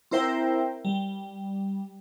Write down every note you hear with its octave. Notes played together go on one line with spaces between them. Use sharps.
C4 E4 A#4 C5 E5 G5
G3